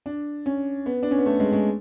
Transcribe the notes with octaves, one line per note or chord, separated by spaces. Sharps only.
D4
C#4
B3
D4
C#4
B3
A3
G#3
G#3